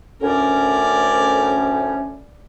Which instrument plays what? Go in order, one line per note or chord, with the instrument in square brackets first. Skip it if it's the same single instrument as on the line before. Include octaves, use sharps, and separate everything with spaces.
[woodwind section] D2 A2 C#4 [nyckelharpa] A#4 D5